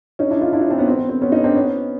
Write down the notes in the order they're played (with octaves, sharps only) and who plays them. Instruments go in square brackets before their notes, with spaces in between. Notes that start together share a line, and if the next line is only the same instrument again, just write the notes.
[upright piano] C#4 D#4
D4 E4
D#4 F4
D4 E4
C#4 D#4
C4 D4
B3 C#4
C4
B3
C4
B3 C#4
C#4 D#4
C4 D4
B3 C#4